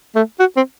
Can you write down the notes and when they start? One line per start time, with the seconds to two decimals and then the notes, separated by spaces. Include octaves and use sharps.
0.15 A3
0.39 F#4
0.56 C4